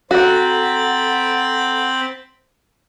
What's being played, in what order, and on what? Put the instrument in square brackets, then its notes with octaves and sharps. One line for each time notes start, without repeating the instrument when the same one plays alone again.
[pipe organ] C4 B5 A6 [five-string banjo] F#4 [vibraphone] A4 F#5 A#5